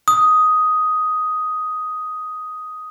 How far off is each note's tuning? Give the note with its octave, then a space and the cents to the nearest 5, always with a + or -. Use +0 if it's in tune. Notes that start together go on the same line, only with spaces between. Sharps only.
D#6 +5